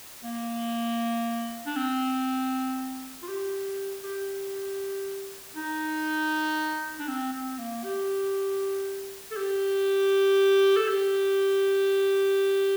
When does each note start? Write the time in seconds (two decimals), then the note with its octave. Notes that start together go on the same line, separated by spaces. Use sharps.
0.24 A#3
1.66 D4
1.76 C4
3.23 F4
3.28 G4
4.04 G4
5.56 D#4
7.00 D4
7.08 C4
7.33 C4
7.58 A#3
7.84 G4
9.31 A4
9.37 G4
10.77 A4
10.88 G4